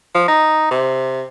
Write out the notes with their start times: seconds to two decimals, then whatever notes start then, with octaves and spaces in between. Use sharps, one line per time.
0.15 F3
0.28 D#4
0.71 C3